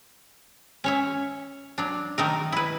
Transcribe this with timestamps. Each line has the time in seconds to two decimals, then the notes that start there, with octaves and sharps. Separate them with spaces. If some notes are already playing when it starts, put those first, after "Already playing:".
0.84 C#4 C#5 E5
1.78 F#3 D4
2.18 D#3 A3 A#4
2.52 E4 B4